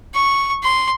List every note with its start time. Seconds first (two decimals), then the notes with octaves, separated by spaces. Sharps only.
0.15 C#6
0.63 C6